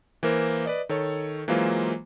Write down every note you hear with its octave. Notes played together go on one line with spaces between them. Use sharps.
E3 A#3 A#4 C5
B4 D5 D#5
D#3 A4 C#5
E3 F#3 G#3 A#3 F4 C5